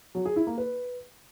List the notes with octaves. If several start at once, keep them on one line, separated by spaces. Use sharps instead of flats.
F#3
G#4
E4
A#3
B4